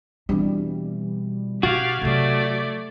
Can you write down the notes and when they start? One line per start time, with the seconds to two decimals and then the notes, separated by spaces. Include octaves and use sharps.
0.29 B2 E3 G3 C4 D4
1.63 B2 F#4 G4 F5 G#6 A6 D7
2.02 C3 F#3 A3 D5